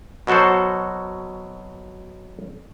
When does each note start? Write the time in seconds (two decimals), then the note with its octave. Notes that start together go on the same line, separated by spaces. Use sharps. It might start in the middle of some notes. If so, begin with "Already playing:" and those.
0.27 B2 F#3 F#4 A4 C5